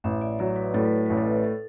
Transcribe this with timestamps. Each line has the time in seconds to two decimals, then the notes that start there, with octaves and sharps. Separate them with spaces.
0.04 A1 E5
0.22 D5
0.39 F#3 D5
0.56 B4
0.74 A2 A4
0.85 B4
0.96 A4
1.06 A1 B4
1.18 A4
1.44 A4